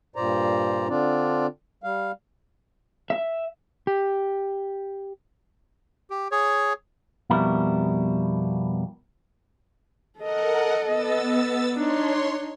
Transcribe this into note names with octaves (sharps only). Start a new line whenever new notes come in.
G2 A#2 C5 D5 A#5
D3 C4 D4 F4 D5
G3 F5
E5
G4
G4
G#4 C#5
F2 B2 G3 B3 E4 A#4
A4 A#4 D#5 F#5
B3 E6 A6
D4 D#4 C#5 C6